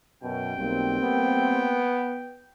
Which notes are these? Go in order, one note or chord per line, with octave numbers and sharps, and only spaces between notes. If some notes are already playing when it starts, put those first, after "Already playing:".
F#2 B2 G5
B1 G3 A#3 C4
B3